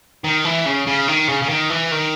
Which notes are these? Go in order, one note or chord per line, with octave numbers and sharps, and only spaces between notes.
D#3
E3
C#3
C#3
D#3
C#3
C#3
D#3
E3
D#3